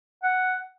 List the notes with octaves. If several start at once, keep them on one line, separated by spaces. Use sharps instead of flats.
F#5